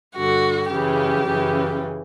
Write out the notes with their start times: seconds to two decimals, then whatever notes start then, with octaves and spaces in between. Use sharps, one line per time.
0.16 G2 D3 F#4
0.72 F#2 C#3 E3 G4
1.27 F#2 C#3 E3